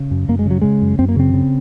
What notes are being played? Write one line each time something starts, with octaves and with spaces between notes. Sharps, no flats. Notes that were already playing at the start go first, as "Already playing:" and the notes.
Already playing: C#3
F#2
F#2 A#3
G#3
C#3 F#3
C#3 G#3
F#2
F#2 C4
A#3
C#3 C4
C#3